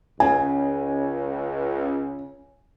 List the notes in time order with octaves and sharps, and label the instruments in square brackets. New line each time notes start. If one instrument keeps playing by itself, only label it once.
[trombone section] C#2 [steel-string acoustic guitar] C#3 [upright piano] G#5